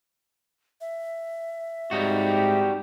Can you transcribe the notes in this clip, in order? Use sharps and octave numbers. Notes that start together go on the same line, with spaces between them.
E5
G#2 G3 C4 D#4 F#4 G4